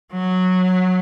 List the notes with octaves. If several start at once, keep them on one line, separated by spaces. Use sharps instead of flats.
F#3